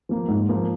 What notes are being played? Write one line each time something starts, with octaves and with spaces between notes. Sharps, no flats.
F3 A#3
G#2
F3 A#3